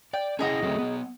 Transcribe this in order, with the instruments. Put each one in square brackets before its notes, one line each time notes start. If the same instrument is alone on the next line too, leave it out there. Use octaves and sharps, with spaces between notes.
[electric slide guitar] D5 [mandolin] G5
[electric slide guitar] C#4 E4 F#5 [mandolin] G#4 D#5 A#5
[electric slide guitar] F#3 A3 C4
F#3 B3